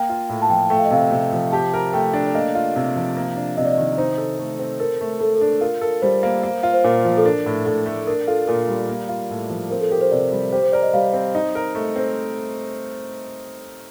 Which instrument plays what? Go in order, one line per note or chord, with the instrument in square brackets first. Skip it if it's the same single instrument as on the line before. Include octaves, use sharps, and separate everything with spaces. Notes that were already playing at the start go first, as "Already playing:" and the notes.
Already playing: [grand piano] A#3 [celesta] G5
[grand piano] F4
A2
[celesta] A5
[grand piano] F3 [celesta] G5
[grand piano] A3 [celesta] G5
[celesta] F5
D#5
[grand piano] C3 [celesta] F5
[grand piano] C3
F3
[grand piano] G4 [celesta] A5
[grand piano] A#4
[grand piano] A3 [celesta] G5
[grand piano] D4
[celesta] D5
[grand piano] A#3 [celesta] D#5
[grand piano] F4
C3
F3
A#3
D4
[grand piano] C3 [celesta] D#5
[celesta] D5
D#5
[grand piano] D#3
[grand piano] D#4 [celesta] C5
[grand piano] A4
A3
C4
[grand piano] A4 [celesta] A#4
[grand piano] A3
[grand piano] A3 [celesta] A4
[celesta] A4
[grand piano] D4
[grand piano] F4 [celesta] A#4
[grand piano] A4 [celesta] A#4
[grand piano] G3 [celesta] C5
[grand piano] A#3
A#3
F4
[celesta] C5
[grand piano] A#2 [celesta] A#4
[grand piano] F3
[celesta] A4
[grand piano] D4 [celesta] A#4
[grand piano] A2
[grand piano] A2 [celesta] A4
[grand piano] A3
[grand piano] D4 [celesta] A#4
[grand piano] F4 [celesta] A4
[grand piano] A#2 [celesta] A#4
[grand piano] G3
A#3
F4
A2
F3
[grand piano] C4 [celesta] A#4
[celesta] A4
[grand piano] G4 [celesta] A#4
[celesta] C5
[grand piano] C3 [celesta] D5
[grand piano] G3
[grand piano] G4 [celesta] C5
[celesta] C5
[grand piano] A#4 [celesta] D5
[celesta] D#5
[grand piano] G3 [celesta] F5
[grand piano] C4
[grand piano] D#4 [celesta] D#5
[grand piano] A#4
A3
[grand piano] C4 [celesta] C5